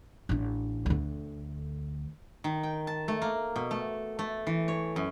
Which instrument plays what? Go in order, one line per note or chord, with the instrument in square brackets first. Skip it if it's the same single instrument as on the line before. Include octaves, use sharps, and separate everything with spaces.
[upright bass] A1 D4
D2 D3
[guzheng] D#3
G5
A5
A3
A#3
B2
A3
A3
E3
C#5
F#2